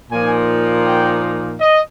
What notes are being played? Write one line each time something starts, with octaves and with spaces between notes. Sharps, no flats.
A#2 F3 A#3 D#4 G#5
G5
D#5